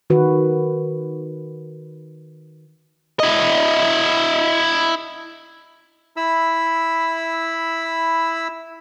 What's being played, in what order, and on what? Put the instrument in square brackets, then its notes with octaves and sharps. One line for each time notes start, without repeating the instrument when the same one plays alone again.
[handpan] D#3 F#4 B4
[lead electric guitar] E4 D#5
[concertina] E4 B5 E6